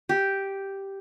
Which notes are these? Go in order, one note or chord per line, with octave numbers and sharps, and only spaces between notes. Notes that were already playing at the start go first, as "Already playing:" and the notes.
G4